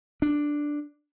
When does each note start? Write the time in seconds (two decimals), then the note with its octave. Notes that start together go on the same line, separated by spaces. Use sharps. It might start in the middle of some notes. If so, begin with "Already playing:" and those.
0.22 D4